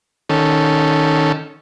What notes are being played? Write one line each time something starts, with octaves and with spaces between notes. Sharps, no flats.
D#3 C#4 A4